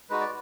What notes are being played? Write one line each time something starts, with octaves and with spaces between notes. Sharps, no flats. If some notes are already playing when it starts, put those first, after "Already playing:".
G#3 D#4 F#4 B4
D5